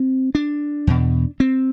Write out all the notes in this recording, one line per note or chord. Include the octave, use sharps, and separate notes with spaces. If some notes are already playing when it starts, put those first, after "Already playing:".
Already playing: C4
D4
E2 B2
C4